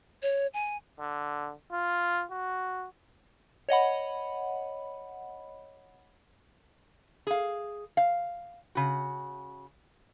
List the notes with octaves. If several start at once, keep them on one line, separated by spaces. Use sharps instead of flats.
C#5
G#5
D3
F4
F#4
C#5 D#5 F#5 B5
G#4 F5
F5
C#3 F#4